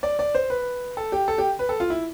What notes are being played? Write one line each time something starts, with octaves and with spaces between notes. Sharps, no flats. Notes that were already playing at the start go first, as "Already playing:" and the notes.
D5
D5
C5
B4
A4
G4
A4
G4
B4
A4
F4
E4